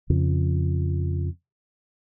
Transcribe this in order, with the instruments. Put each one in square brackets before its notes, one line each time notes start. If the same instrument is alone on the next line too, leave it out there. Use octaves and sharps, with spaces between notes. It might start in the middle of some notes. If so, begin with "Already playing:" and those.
[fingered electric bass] F2 C#3 F3